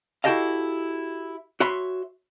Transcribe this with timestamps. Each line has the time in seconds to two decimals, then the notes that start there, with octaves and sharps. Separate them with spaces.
0.24 E4 F#4 G4 A4 D#5 F5
1.60 F#4 C#5 E5 B5 C6